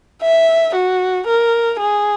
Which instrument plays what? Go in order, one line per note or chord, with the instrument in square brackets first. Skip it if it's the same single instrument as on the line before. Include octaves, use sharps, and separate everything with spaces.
[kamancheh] E5
F#4
A#4
G#4